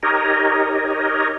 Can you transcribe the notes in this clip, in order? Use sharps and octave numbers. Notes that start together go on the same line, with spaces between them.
D#4 G4 A#4 C#5 D#5